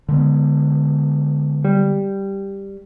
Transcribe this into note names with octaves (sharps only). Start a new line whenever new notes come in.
D3 G#3 B3
G3